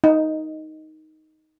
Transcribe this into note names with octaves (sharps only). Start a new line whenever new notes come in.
D#4